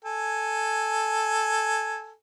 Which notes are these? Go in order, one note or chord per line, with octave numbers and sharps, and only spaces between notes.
A4 G#5